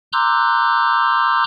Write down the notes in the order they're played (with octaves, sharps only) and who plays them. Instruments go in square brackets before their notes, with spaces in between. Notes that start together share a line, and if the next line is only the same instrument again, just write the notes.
[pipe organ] A#5 C6 D6 E6 F#6 G6